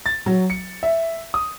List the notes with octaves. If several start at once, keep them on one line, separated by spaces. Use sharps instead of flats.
A6
F#3
C#7
E5
D#6